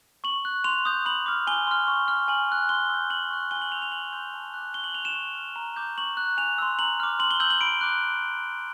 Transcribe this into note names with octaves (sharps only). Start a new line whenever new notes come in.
C#6 F#7
F#6
C6 F7
D#6 G6
B5 F#7
D6 F6
G#5 G7
C6 F6
C#6
F6
G#5 F#7
C#6 F#6
C6 G7
E6 G6
G#5 F#7
C#6 F#6
G#5 G7
F#7
C#6 E6 G6 F7
F7
G#5 F#7
C6 E6 G6
A5
D6 F#6
C#6 G7
F#7
F#6 F7
E7
C#6
F6
A#5
D6 G6
C#6 F#7
F#6
G#5 F7
C6 E6
A#5 F#7
D6 F6
C6 F#7
G7
E6 G6 F#7
F#7
B5 D7
D6 F#6